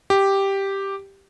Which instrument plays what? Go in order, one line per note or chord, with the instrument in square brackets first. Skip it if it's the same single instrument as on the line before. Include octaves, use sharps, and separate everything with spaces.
[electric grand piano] G4